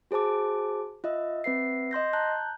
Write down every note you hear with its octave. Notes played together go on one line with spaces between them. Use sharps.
F#4 G#4 C5 A5 D6
F4 D#5 E5
C4 B4 E5 C7
D#5 C6 G6 A#6
A5 A#5 F#6 G6